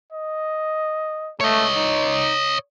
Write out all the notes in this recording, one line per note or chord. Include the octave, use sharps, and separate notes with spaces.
D#5
A3 C#5 D#5
D#4